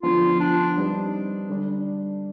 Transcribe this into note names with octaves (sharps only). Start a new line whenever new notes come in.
D3 F3 B3 F4
D4
G3 C4 D#4 G4 B4
D3 G3 D4